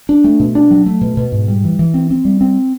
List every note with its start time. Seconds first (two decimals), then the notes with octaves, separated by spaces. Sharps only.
0.09 D4
0.24 A3
0.40 B2
0.55 D4
0.70 F#3
0.86 A3
1.01 B2
1.17 B2
1.32 G#2
1.48 G3
1.64 E3
1.79 E3
1.94 C4
2.10 C4
2.25 G3
2.41 C4